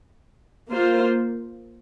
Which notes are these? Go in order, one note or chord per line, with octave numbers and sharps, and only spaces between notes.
A#3 F4 C5